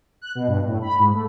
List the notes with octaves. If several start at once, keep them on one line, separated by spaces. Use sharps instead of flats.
F#6
B2
G2
A2
B5
G#2
A3